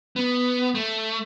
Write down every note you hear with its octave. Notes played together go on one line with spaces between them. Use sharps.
B3
A3